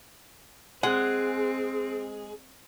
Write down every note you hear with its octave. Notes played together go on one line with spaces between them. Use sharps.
G#3 C4 G#4 F#5